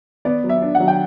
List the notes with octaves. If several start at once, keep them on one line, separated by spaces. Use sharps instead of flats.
B3 D5
F#3
E5
D4
F#5
F#3
G5